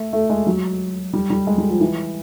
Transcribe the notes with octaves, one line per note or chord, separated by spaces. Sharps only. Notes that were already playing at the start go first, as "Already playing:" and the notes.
Already playing: A3
A3
G#3
F#3
G3
G3
G#3
G3
F3
E3